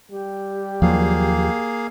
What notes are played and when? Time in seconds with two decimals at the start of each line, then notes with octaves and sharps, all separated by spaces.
0.12 G3 G4
0.82 D#2 F3 F#3 A#3 G#4 F5